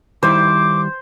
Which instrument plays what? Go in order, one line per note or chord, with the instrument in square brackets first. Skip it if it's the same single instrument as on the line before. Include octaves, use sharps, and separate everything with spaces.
[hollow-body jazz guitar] D#3 G3 E4 [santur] C5 [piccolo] D6